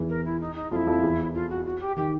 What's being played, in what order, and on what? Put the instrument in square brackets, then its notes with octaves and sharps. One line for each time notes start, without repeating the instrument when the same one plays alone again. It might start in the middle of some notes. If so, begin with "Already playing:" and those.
Already playing: [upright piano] E2 E3
[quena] A#4
E4
D#4
D#4
[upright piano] F2 F3 [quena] F4
[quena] E4
[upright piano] F2 F3
E2 E3
[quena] F4
F#4
F#4
G4
[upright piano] D#3 [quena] G4